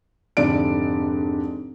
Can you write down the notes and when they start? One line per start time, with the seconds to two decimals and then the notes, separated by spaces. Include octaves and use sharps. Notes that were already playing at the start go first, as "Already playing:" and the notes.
0.37 F1 G#2 D3 D5 D7